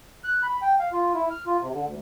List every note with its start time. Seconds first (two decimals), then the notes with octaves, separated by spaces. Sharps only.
0.24 F#6
0.43 B5
0.62 G5
0.80 F5
0.93 F4
1.14 E4
1.30 F6
1.46 F4
1.61 C3
1.73 D3
1.86 D2